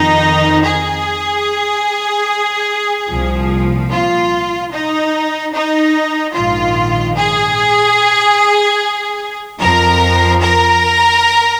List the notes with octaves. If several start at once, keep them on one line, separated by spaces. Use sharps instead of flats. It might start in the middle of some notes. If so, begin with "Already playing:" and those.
Already playing: F2 D#3 D#4
G#4
C2 A#2 F3
F4
D#4
D#4
A#1 G#2 D#3 F4
G#4
F2 F3 A#4
A#4